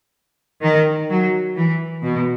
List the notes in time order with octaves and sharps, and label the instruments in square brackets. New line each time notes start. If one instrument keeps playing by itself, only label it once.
[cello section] D#3
F#3
E3
B2